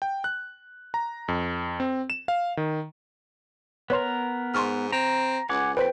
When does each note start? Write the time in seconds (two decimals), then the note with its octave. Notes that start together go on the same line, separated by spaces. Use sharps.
0.02 G5
0.24 F#6
0.94 A#5
1.28 F2
1.80 C4
2.10 E7
2.28 F5
2.57 D#3
3.90 B3 A#4 B4 C#5 C6
4.54 G#2 C6 C#6 F6
4.92 C4 A#5
5.49 C#2 F#5 G#5 D6
5.77 F2 B4 C5 G5 B6